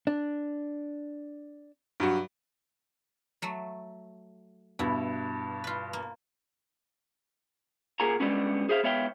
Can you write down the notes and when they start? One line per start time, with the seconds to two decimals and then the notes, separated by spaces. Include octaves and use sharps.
0.07 D4
2.00 G2 F#3 F#4
3.42 F#3 A3
4.79 G2 B2 E4
5.64 F4 B4
5.93 A#3
8.00 A#2 A#3 G#4 F#5 G#5 A#5
8.20 D3 G3 G#3 B3 C#4
8.69 G#4 C5 E5 F5
8.83 G#2 B3 C#5 E5 F5 G5